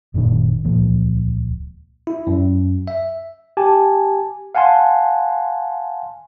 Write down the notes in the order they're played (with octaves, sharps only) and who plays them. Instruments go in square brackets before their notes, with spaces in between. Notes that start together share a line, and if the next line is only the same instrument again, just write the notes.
[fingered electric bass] F#1 A#2 D#3 D4
D#1 C#2 A#2 F3
[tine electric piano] E4
F#2
E5
G4 G#5 A5
F5 F#5 G#5 A5 C6